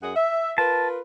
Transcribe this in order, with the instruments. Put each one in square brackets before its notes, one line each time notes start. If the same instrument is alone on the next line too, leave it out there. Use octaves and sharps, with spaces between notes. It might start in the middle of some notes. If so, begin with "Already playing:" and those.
[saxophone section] F#2 G#4 F#5
E5
[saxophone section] F4 A#4 B4 [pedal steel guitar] A5